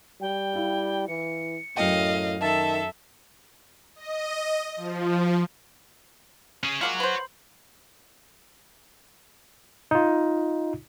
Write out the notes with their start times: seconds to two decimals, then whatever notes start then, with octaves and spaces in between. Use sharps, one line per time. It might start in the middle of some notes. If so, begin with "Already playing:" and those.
0.21 G3 G5
0.53 E4 F5
1.08 E3 C#7
1.77 F#2 A2 D#5 F5 G5
2.41 D#3 A4 E5 A5
3.96 D#5
4.77 F3
6.63 C#4 G#4
6.81 G#3 A#3 F4 C#5 F#5
7.00 B4 C5
9.91 D#4 F4